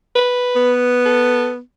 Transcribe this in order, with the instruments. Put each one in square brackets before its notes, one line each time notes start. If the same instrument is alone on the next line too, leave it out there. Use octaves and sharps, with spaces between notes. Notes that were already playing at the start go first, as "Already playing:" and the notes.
[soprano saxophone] B4
[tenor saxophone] B3
[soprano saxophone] A4